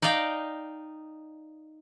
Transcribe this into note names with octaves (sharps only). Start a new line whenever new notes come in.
D#4 D5 D#5 F5 G5